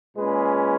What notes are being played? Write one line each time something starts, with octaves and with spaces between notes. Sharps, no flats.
A#2 G#3 C#4 G#4 B4